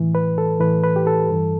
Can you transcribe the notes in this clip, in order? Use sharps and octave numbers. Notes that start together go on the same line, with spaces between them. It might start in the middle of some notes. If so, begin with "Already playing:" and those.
Already playing: A2 E3
B4
A4
A2 E3 B4
B4
G4
A4
G2 E3